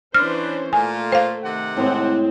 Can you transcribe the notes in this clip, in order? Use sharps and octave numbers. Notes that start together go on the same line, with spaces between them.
E3 C#4 D4 B4 C5 F6
A#2 A3 F4 G#5
C5 F5
C3 D#3 F#5
A2 G#3 C4